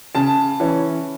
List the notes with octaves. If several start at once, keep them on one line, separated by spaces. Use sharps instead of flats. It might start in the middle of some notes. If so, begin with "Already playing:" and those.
C#3 A5
E3 C#4